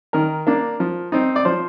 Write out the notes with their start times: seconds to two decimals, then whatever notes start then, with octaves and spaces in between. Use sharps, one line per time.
0.13 D#3 A#4
0.47 A#3 D4
0.80 F3
1.12 C4 D#4
1.36 D5
1.45 F3 C5